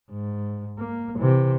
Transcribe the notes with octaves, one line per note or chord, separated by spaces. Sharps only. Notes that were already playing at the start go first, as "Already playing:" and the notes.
G#2
A#3
C3 E3